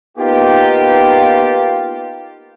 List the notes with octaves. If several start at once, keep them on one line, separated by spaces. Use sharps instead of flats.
A#3 B3 D#4 F4 G4